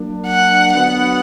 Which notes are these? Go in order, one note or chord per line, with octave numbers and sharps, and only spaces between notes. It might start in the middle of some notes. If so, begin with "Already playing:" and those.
Already playing: F#3 A#3 D4
F#5
D3 F#3 B3 F#5